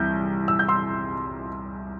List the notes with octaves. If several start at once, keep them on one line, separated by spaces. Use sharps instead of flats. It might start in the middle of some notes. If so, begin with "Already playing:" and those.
Already playing: C2 E3 G6
E6
G6
C6 E6